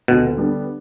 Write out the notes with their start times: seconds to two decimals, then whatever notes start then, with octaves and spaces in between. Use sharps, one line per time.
0.08 D2 B2
0.37 D3 G3 B3 D4